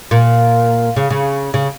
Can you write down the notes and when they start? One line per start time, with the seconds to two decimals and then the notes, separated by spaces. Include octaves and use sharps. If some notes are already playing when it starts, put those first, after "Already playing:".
0.11 A#2
0.96 C#3
1.10 C#3
1.54 C#3